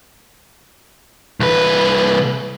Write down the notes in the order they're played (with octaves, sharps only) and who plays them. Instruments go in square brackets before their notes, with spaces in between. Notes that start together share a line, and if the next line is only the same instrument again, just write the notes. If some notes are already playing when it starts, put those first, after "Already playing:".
[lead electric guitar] C2 B4